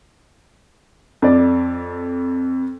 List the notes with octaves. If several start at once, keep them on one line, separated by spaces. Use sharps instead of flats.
F2 D5